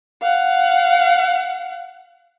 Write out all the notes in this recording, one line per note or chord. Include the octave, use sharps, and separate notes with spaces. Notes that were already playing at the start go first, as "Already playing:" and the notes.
F5 F#5